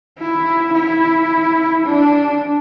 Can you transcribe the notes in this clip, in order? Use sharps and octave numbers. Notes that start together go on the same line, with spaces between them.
E4
E4
D4